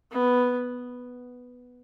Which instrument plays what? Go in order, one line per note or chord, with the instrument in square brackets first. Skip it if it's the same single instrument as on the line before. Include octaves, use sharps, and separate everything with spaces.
[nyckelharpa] B3